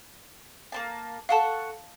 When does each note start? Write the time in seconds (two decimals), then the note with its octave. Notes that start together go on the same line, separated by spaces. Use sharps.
0.72 A#3 C4 A5
1.29 A4 F5 F#5 A5 C#6